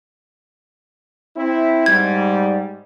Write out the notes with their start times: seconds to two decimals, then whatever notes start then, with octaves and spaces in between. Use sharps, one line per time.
1.36 C4 E4
1.86 G#2 G3 G#6